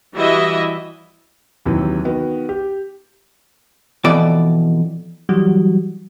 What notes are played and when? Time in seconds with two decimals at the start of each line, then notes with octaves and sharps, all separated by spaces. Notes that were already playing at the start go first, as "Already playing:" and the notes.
0.15 E3 G3 E4 F#4 D#5 E5
1.65 D#2 C3 E3 F#3
2.05 D#3 B3 F#4
2.49 G4
4.04 F2 B2 E3 D5
5.29 E3 F#3 G3 F#4